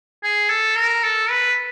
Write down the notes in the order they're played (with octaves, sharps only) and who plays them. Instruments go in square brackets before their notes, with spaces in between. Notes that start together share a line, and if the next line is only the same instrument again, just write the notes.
[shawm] G#4
A4
A#4
A4
B4